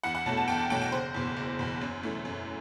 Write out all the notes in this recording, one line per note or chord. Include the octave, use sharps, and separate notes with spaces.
E2 F#5
F#5
B2 F#3 A3 A5
A5
E2 G5
A5
B2 F#3 A3 G5
G5
F#1 C5
E2 B2
F#1
E2 B2
F#2
E3 A3
F#2